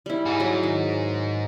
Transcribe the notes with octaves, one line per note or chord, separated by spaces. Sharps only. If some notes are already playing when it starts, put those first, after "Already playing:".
G3 E4
G#2 D#4
F#3
D#3